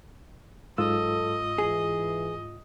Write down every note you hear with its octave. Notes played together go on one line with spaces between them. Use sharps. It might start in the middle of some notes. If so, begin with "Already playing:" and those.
G#2 F#3 F4 A4 D#5 E6
E3 G#4